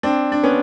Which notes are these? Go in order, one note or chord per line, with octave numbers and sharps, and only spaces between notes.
C4 D4
D4
B3 C#4